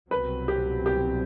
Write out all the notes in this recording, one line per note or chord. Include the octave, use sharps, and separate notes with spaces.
C2 B2 F#3 C4 B4
G4
G4